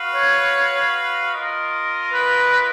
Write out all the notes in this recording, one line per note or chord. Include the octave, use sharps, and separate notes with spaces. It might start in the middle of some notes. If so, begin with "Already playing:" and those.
Already playing: F#4 B4 F5
C#5
F4 A#4 D#5
B4